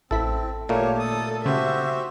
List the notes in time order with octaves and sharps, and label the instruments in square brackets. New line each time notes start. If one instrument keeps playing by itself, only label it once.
[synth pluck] A1 E4 B6 [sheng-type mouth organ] C4 [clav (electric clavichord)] A4
[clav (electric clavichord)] A#2 A3 A#3 [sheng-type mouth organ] G4 [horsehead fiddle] C#5
[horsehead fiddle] A4 [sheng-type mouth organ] D#6
[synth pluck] C#3 [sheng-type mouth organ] F#4 G4 C5 [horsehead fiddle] E5